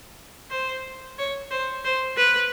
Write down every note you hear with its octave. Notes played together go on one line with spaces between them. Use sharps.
C5
C#5
C5
C5
B4